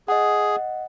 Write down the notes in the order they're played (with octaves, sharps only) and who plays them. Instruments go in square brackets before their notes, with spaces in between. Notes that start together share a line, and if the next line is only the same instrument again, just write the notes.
[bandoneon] G#4 [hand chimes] D#5 F#5